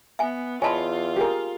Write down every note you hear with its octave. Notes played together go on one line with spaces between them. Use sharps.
B3 E5 G#5
E2 F4 C#5 D#5 G#5 A5 B5 C6
G4 G#4 A#4